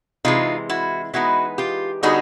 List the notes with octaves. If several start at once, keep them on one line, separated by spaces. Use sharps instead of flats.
C3 E3 G#3 D#4 F4
E4 F#4
E3 G#3 B3 D#4 E4 F#4
F4 G4
D3 G3 B3 D#4 F#4 G#4